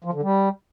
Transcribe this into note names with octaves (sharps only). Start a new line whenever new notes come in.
F3
D3
G3